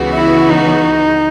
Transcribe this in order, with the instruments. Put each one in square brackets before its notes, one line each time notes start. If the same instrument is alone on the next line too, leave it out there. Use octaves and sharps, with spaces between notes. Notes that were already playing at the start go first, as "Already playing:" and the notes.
Already playing: [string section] C#2 C#3 E3 B3 F#4
[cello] E4
D#4